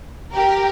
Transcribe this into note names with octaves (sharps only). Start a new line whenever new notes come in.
G4 A#4